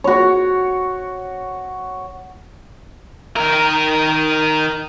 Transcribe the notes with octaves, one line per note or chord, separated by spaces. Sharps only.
F#4 C#5
D#3 A#4